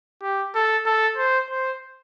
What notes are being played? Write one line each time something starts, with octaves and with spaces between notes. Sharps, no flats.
G4
A4
A4
C5
C5